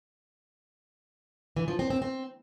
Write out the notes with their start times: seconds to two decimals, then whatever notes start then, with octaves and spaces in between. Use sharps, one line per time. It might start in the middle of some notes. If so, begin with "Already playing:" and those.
1.56 E3
1.68 F3
1.79 C4
1.90 C4
2.02 C4